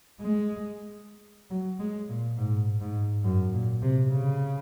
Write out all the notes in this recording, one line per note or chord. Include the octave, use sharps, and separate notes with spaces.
G#3
F#3
G#3
A#2
G#2
G#2
F#2
A#2
C3
C#3